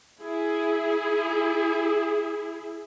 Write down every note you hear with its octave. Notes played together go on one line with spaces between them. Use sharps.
E4 G#4